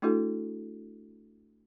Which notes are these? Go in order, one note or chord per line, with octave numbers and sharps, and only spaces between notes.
A3 D4 E4 F#4 A4